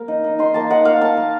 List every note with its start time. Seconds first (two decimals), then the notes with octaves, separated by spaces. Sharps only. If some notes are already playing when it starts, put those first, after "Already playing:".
Already playing: A#3
0.08 D#4
0.24 D#4
0.39 D#4 C6
0.54 A#3 A5
0.70 D#4 F#5
0.85 A#3 F5
1.01 A#3 A5
1.17 A#3